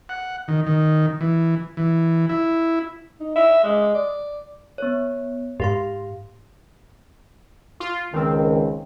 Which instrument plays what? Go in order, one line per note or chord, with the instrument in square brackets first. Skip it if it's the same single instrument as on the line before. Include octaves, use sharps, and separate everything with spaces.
[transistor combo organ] F#5
D#3
D#3
E3
E3
E4
[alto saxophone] D#4
E5
G#3
D5
[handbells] B3 C#5
[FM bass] G#2 [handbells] G4 F5 C6
[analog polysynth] F4
[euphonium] C#2 [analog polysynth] D#3 C4